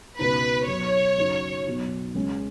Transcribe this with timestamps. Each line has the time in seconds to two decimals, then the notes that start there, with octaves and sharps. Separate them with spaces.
0.19 C#2 B2 B3 D#4 B4
0.68 B1 B2 B3 C#5
1.17 F#2 C#3 F#3 D#4
1.66 B1 B2 B3 D#4
2.15 C#2 C#3 G#3 C#4